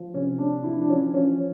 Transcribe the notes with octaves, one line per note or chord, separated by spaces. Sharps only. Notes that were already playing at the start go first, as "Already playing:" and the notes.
Already playing: F3
C3 C#4
C3 D4
F3 E4
D4
F3 C#4
F3 C#4